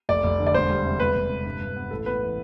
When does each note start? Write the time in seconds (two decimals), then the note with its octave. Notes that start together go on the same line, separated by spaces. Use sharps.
0.09 F1 D5
0.24 F1
0.40 D3
0.47 D5
0.54 E1 C5
0.70 G3
0.85 C3
1.00 E1 B4
1.15 E1
1.30 C3
1.45 G2
1.61 G2
1.76 B3
1.91 A1 A4
2.06 B3 B4
2.22 E3